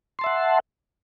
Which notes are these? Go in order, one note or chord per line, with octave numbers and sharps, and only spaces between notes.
E5 F#5 A5 C6